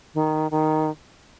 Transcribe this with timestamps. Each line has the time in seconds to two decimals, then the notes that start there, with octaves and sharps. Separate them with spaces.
0.14 D#3
0.51 D#3